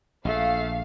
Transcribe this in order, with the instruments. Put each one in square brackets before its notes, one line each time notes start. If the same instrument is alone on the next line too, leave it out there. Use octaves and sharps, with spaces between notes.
[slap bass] A#1 [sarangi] A3 [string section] F5